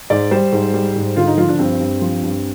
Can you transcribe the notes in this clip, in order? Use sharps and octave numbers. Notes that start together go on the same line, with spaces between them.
G#2 D5
G3 C5
G#2
G3
G#2
D3 F4
D#4
F3 F4
D4
G2 C4
G2
F3
G2